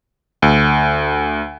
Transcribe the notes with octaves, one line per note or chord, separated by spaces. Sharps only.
D2